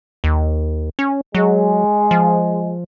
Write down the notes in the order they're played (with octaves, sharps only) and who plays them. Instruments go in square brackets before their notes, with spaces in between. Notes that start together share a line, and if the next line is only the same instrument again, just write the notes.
[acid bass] D#2
C#4
[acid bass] F#3 [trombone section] G#3
[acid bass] F3